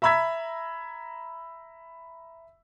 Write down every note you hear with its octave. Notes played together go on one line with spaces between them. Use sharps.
E5 A#5 B5 E6 G#6 B6